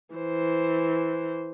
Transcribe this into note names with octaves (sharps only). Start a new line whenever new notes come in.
E3 C5